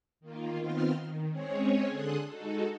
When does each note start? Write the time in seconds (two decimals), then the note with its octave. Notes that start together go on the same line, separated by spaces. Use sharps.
0.20 D#3 A#3 F4
0.60 D#3 B3 C4 F4 C6 F6
1.01 D#3
1.31 G#3 C4 C#4 G#4 C#5
1.88 D3 G#4 A4 C6 D#6 F#6
2.29 G#3 D#4 F#4 A4